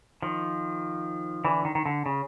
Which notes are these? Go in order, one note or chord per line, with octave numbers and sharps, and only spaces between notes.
D#3 F3
D3 E3
D#3
D#3
D3
C#3